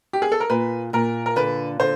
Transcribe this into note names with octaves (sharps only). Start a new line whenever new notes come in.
G4
G#4
A4
A#4
A#2 B4
A#2 A#4
A#4
D3 B4
D3 C5